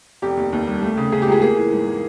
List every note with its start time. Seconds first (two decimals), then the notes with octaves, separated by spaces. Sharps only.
0.22 F1 G4
0.37 D#2
0.53 D#2
0.67 G3
0.82 A3
0.97 C#3
1.12 C#3 G#4
1.22 G4
1.27 C#2 G#4
1.42 A#3 G#4
1.56 E3
1.72 G#2
1.86 A#3